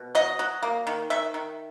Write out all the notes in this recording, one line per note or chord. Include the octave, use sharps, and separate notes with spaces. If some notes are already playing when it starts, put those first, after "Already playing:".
Already playing: B2
F#3 D#5
F#3
A#3
D#3
D#3 E5
D#3